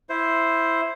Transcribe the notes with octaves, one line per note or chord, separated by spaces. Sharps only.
E4 C5